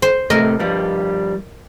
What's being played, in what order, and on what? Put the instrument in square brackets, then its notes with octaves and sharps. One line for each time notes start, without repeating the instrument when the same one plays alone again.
[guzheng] C5
[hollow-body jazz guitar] A2 C3 A3 [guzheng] A#4 D#5
[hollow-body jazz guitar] G2 F3 G3